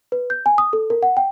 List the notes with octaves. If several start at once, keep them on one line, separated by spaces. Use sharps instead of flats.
B4
G6
G#5
D#6
A4
A#4
F#5
G5